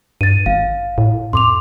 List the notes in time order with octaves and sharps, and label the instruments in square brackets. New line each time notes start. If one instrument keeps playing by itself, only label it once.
[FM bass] G2 [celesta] A6 D#7
[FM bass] G#1 [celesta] F5
[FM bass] A2
[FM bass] F2 [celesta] C6 D6 F7